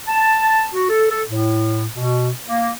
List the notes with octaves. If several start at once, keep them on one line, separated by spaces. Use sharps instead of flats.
A5
F#4
A4
A4
A2
B2
A#3